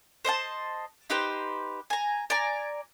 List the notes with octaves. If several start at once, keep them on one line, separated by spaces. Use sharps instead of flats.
C5 D#5 E5 A5
D#4 G4 B4 C5
G#5 A#5
D5 G#5 A#5